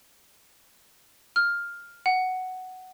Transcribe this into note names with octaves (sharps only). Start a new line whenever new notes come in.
F6
F#5